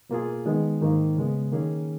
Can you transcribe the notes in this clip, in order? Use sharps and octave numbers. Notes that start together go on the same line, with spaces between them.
B2 A#3 F4 G#4
D#3 G#3 B3
G#2 D#3 A#3
C#3 G#3 B3
D#3 A#3 C#4 G#4